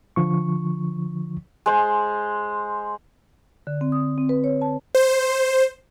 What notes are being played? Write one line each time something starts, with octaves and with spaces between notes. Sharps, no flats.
D3 F3 C#6
G#3 C5
D3
C4
D#6
C4
B4
C#5
A5
C5